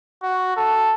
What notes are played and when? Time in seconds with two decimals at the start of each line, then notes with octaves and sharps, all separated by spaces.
0.23 F#4
0.57 A4